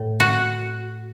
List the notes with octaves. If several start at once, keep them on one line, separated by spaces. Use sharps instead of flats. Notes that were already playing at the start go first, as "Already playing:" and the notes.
Already playing: A2
F#4